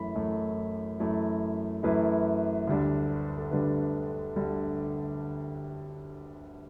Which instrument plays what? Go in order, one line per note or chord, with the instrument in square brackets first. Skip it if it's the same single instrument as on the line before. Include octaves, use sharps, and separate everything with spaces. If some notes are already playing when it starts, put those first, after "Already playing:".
Already playing: [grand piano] F#2 E3 A3 E4 B5
F#2 E3 A3 E4
F#2 E3 A3 E4
F#2 E3 A3 E4 B4
D2 D3 G3 D4
A4
D2 D3 G3 D4 B4
D2 D3 G3 D4